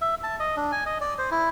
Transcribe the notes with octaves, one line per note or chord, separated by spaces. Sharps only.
E5
A5
D#5
D4
G#5
D#5
D5
C5
E4